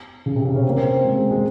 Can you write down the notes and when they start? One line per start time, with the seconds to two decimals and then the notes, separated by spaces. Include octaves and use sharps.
0.26 C#3
0.36 C3
0.45 C#3
0.55 C#4
0.63 C4
0.69 A#3
0.77 C4
1.04 G#3
1.17 G#3
1.31 G#3